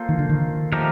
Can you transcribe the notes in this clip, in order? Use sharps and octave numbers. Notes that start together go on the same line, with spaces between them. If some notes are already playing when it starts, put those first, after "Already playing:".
Already playing: A#3 F4 A4 C5
D#3
D3
D#3
F3 A3 D#4 G4 A#4